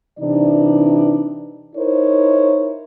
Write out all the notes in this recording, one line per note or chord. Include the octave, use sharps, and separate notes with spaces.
C3 E3 D4 D#4 D5
D#4 E4 A#4 C5 C#5